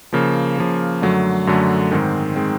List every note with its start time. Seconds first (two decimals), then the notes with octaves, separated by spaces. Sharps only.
0.13 C#3 F3 A#3
0.58 C#3 F3 A#3
1.02 F#2 D3 F#3 A3
1.47 F#2 D3 F#3 A3
1.91 G#2 D#3 G#3 C4
2.36 D#3 G#3 C4